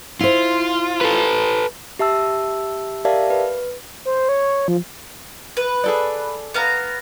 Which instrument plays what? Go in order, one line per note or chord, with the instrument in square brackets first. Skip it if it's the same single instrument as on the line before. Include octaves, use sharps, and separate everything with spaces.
[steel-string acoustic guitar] E4 C5 [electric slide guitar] F4
[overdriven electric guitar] A4 B4
[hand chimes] G4 E5 A5 E6
G4 A#4 D5 E5 F5 A5
B4
[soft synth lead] C5
C#5
F3
[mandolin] B4
[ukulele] G#4 A4 D5
[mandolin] B3 F5 A#5